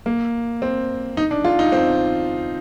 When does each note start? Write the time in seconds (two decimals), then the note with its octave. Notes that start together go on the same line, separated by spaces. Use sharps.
0.06 A#3
0.62 C4
1.17 D#4
1.31 D4
1.44 F4
1.59 D#4
1.72 C4